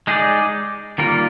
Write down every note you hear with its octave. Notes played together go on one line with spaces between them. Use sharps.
G#3 D#4 G#4 D5
D#3 G3 A#3 F4 A#4